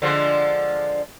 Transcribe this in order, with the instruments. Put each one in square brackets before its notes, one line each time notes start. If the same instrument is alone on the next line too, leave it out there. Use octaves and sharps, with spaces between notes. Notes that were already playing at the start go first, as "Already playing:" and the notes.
[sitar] D3 F3 G#3